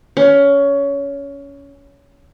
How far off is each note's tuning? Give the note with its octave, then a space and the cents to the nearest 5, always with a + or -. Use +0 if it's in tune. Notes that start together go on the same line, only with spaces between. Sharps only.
C#4 +20